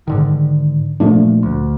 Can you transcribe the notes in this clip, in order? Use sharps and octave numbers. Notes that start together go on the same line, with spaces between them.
G#2 D3 D#3
A#2 F3 A3 D4
D2